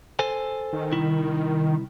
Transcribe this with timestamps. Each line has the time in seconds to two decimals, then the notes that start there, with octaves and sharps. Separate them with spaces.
0.19 A4 C5 G#5
0.73 D#3
0.92 C2 E4